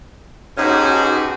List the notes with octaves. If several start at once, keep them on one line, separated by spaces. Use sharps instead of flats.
G#2 B2 C#4 D#4 F#4 G4